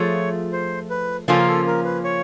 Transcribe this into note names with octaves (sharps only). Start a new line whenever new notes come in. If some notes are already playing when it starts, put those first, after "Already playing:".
Already playing: F3 A3 F4 G#4 C#5
C5
B4
C#3 F3 A#3 C#4 F4 A4
A#4
A4
A#4
B4
C#5